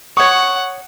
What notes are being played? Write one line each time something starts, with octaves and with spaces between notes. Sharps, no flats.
C#5 F#5 C#6 D#6